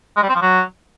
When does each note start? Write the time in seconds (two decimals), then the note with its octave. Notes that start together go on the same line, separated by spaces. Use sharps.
0.16 G#3
0.23 G3
0.29 C4
0.35 F3
0.42 F#3